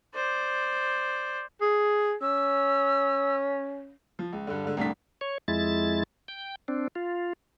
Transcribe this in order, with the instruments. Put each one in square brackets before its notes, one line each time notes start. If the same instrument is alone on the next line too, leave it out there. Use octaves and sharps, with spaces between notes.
[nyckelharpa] C5 D5
[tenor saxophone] G#4
[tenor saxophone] C#4 [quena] E6
[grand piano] F3
C#2
G2 D3
G#2 D3
C2 A2 D4 B6
[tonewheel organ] C#5
F2 G#3 E4 A6
G5
C4 D4
F4